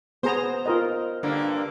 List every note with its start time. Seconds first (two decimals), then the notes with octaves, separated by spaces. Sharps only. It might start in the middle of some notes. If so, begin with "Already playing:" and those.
0.23 B3 G#4 C5 A#5
0.66 F4 A#4 D#5
1.23 G2 D3 A#3